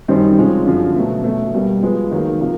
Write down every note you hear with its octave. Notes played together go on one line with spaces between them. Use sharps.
F#2 D#3 G3 C4 D#4
C3 F3 G#3 C#4
F#2 D3 F3
B2 F#3 A3
B2 F#3 A3
B2 G3 A#3
F3 G#3 B3
D#3 F#3 A#3
C3 F3 A#3